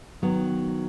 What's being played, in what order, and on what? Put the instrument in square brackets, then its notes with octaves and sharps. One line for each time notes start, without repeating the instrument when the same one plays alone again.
[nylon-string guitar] D#3 F#3 B3